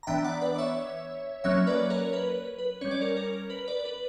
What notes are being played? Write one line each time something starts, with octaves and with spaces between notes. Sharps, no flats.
A#5
E3 B3 D4 E5 G5
D5 F#5
B4 D5
D5
C#5 E5
F#3 A#3 C#4 C#5 E5
B4 D5
A#4 C#5
B4
B4
G3 C#4 C#5
D5
A#4 C#5
A#4
B4
B4 D5
B4